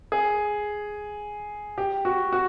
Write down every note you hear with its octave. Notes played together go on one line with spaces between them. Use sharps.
G#4
G4
F#4
F#4